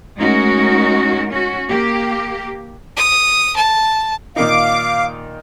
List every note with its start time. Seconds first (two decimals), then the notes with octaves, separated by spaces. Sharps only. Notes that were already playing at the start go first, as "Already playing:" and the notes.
0.17 G#3 A3 C#4 D#4 F#4 A#4
1.31 C#4 F#4
1.69 A#3 G4
2.97 D#6
3.56 A5
4.36 A#2 D#3 D#4 F5 D6